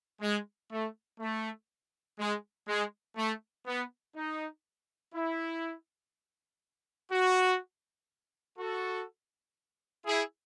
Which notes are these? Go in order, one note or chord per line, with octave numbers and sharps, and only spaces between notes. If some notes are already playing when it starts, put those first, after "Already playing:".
G#3
A3
A3
G#3
G#3
A3
B3
D#4
E4
F#4
F#4 A4
E4 G#4